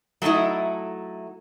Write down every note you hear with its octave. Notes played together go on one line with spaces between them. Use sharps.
F#3 A3 C#4 D#4 E4